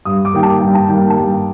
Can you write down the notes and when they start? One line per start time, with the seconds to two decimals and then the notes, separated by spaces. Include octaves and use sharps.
0.05 G2 D#6
0.25 D6
0.33 D#3 G3 A#3 G5
0.43 A5
0.61 G2 G5
0.75 A5
0.89 D#3 G3 A#3 G5
1.10 A5
1.17 G2 G5